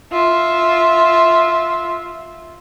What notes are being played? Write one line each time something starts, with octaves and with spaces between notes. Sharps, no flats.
F4 E5